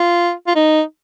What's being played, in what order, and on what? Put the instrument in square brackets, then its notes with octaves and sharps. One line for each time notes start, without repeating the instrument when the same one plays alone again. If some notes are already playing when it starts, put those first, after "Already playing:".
Already playing: [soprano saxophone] F4
F4
D#4